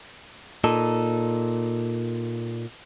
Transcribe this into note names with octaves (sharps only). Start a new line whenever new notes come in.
A#2 D#4 A4